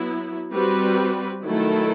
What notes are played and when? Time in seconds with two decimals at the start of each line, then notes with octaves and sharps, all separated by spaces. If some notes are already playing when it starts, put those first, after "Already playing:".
Already playing: F#3 B3 E4
0.53 G3 C4 F#4 B4
1.43 D#3 F#3 A3 E4 A4